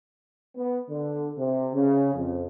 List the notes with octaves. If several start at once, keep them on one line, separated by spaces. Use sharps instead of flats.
B3
D3
C3
C#3
F2